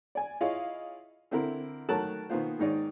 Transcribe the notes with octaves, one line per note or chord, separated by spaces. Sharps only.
D5 G#5
E4 F4 G#4 C#5 D#5 F5
D3 C4 E4 A#4
D#3 F#3 A3 A#4 A5 F#6
B2 D#3 A#3 B3 F4 C5
G#2 D#3 D#4 C#5 D5